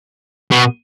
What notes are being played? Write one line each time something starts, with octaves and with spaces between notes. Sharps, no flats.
B2